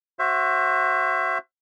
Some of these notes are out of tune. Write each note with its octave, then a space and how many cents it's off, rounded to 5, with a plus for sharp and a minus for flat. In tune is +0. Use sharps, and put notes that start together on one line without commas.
F#4 +0 C5 +25 E5 +25